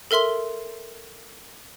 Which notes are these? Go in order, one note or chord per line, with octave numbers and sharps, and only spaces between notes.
A4 A#4 E5 C6 G7